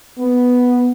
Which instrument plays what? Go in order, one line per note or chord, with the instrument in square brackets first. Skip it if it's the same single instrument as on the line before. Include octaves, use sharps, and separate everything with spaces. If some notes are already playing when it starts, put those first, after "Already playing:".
[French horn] B3